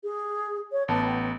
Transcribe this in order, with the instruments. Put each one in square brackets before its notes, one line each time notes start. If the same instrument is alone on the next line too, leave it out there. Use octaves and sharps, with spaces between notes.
[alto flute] G#4
C#5
[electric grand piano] A1 B3 [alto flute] A5
[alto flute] G5